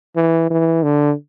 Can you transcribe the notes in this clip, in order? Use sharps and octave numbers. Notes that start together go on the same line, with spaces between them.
E3
E3
D3